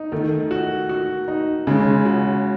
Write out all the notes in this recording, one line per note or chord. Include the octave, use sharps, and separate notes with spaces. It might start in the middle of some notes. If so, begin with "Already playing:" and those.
Already playing: D#4
D#3 A3
F#4
F#4
D#4
C#3 G#3
F#4